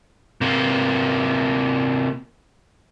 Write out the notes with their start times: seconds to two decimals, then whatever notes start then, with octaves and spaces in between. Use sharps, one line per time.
0.41 C3 A#3